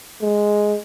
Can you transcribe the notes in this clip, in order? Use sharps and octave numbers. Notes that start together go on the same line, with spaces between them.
G#3